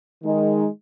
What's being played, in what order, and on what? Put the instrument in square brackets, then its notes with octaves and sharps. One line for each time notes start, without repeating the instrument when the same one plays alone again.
[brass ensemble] D#3 G#3 D#4